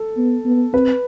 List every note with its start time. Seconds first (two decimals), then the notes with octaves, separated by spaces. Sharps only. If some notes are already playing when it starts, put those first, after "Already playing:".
Already playing: A4
0.17 B3
0.46 B3
0.73 C4 B4